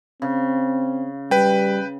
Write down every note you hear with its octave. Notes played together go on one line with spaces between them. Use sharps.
C#3 C4
G3 B4 G5